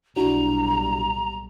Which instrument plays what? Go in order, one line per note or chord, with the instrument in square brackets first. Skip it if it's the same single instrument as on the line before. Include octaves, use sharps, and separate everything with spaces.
[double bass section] B1 A#2 G3 [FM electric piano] D4 E4 F#4 [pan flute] A#5